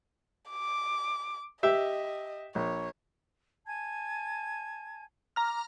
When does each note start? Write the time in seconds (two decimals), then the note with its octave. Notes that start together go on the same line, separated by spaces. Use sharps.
0.50 D6
1.63 G4 D#5 E5
2.55 A#1 C#5
3.66 G#5 A5 G#6
5.36 A#5 D6 F6